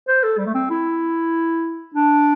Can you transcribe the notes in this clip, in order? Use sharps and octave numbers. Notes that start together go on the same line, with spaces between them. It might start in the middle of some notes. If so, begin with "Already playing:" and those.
C5
A4
G3
A3
C4
E4
D4